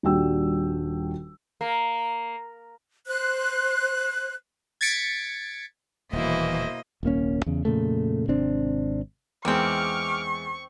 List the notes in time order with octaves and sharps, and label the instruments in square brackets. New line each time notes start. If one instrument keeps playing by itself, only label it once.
[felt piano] D#1 G3 D4 F#4 G5 E6
[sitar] A#3
[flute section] C5 F#6
[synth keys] G#6 A6 B6 C#7 D7
[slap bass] D#1 [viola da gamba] B2 E4 C5 [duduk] E3 [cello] A#3 D#5
[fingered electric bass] D#1 C2 A#3 C#4
E2 C#3
F2 A#2 C#3 A3
G#1 C3 C4 D4
[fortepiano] E2 G#3 [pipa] D#3 C4 [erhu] C#6 [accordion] D6 F6